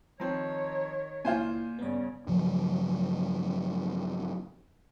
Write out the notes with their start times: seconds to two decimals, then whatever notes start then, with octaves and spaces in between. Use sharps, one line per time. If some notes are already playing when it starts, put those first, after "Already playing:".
0.20 D#3 F3 C4 C#5 A#5 C6
1.25 C#2 A#2 E4 F4 C5 G#5
1.79 G2 C#3 B3 D5
2.27 G2 C#3 F3 F#3